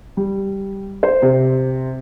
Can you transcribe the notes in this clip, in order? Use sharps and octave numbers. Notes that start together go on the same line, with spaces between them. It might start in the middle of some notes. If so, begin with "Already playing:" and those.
G3
C5
C3